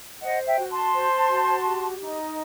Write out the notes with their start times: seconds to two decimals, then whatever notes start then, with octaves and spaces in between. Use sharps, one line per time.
0.23 C5 D#5 F#5
0.46 E5 G5
0.58 F#4
0.71 A5 C6
0.94 C5
1.29 F#4
1.66 G4
2.02 D#4